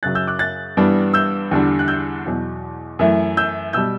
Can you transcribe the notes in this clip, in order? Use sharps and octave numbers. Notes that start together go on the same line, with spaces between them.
F#2 C#3 F#3 F#6 A6
E6 G6
D6 F#6
F#6 A6
G2 E3 G3 B3 D4
E6 G6
E2 D3 G3 D4
F#6
E6 G6
E2 B2 F#3
F#2 E3 A3 E4
E6 G6
B2 G3 E6 G6